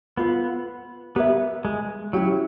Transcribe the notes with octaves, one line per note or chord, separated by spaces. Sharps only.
B3 F4 A4 C5
B3 G4 A#4 C#5 E5
G#3
F#3 C#4 E4 G4